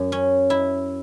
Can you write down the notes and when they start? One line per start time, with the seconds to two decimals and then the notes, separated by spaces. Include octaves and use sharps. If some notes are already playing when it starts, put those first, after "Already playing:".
Already playing: F#2
0.12 C#4
0.50 E4